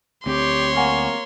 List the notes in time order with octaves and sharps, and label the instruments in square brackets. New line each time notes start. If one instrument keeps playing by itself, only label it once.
[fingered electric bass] D2 C4 [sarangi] G4 [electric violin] C#5 C6
[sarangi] A#3 [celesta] F#5 G#5 C#6